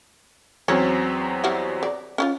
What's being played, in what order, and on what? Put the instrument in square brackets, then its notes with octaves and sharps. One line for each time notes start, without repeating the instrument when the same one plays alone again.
[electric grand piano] E2 F#3 C4 [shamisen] C#4
[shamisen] G3 E4 F#4
D5
C#4 E4 F4